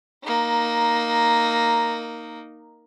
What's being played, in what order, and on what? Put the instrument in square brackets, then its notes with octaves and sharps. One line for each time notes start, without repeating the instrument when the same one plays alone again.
[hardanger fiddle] A#3 D#4